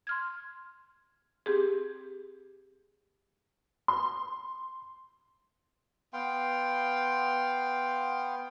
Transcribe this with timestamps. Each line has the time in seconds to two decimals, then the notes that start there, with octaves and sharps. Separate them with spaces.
0.07 C6 F6 G#6
1.46 C4 G4 G#4
3.88 C6
6.13 B3 F5 G5 C6